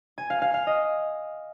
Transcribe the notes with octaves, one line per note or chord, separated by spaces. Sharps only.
G#5
F5
F5
F5
D#5